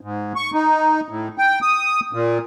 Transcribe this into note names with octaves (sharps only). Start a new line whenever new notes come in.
G#2
C#6
D#4
A2
G5
D#6
A#2